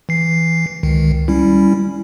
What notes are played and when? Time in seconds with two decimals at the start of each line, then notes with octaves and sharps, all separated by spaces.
0.09 E3 C7
0.83 C#2 D#3
1.28 G3 C#4 E4